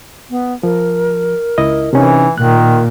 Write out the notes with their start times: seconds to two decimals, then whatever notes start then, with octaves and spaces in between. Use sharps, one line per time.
0.30 B3
0.63 F3 A#4
1.58 C#2 E4 D#5
1.93 C3 E3 C#4 D#4
2.38 A#2 D#3 F#6